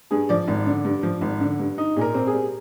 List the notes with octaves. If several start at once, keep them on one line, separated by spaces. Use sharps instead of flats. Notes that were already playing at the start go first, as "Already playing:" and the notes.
G2 G#4
F3 D5
G#1
D3
G2
F3
G#1
D3
G2
D#4
A#2 G#4 A#4
C4
G#4
G3